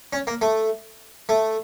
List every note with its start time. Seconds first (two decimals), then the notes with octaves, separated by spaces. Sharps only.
0.13 C#4
0.27 A#3
0.41 A3
1.29 A3